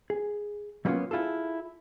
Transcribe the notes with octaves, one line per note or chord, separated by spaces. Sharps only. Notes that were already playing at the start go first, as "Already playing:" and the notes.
G#4
F#3 G3 A#3 B3 C#4 F4
E4 F4 G#4 A4